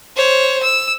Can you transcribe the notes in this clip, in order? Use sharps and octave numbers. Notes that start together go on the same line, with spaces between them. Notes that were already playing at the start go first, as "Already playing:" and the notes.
C5 C#5
E6